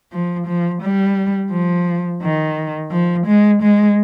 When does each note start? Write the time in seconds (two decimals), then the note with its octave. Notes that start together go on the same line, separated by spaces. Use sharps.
0.12 F3
0.47 F3
0.82 G3
1.51 F3
2.22 D#3
2.91 F3
3.26 G#3
3.62 G#3